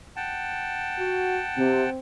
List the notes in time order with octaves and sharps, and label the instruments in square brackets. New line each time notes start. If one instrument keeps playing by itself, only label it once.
[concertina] F#5 G5 A5
[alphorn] F#4
[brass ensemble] C3 [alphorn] C4